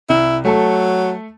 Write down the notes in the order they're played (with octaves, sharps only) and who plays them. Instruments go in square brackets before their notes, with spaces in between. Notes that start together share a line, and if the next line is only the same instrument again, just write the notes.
[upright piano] C2 [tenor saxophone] E4
[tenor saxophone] F#3 [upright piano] A3 A4 A5